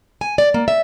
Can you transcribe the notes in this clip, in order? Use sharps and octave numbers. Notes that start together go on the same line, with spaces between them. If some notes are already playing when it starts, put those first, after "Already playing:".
G#5
D5
A#3
E5